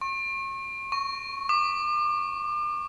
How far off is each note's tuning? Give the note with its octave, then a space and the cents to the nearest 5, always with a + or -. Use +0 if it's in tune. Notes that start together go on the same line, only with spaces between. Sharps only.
C#6 -40
C#6 +0
D6 +40